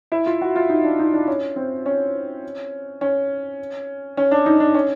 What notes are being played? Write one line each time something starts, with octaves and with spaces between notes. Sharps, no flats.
E4
F4
F#4
F4
D#4
D4
D#4
D4
C#4
C4
C#4
C#4
C#4
D4
D#4
D4
C#4